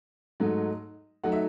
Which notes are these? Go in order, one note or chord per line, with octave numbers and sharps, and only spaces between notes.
G#2 F#3 A3 D#4
F#3 A3 D#4 F#5
E5